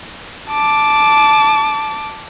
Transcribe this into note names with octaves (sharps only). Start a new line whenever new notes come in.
A5 D6